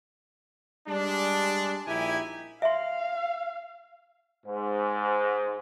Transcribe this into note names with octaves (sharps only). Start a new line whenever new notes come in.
G3 G#3 D4
A#1 D#4 E4 G4 G#5
E5 F5 C6
G#2